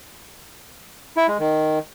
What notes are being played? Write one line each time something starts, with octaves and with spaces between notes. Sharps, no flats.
E4
G#3
D#3